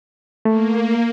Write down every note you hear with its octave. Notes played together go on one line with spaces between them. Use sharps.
A3 A#3